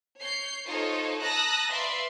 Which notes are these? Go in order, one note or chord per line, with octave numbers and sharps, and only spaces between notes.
C#5 G6 C7
D#4 F4 A4 C5 C#5
A5 A#5 D#6 E6 F#6 A#6
B4 D5 E5 F5 C6